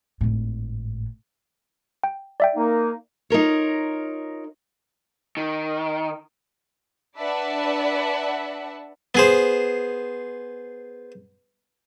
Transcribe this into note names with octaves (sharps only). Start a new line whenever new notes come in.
G#1 A2
G5
D5 E5 G5
A#3 D#4
D#4 F4 A#4 C#5
D#3
D4 B4 D5 E5 F#5 A5
B3 G#4 C5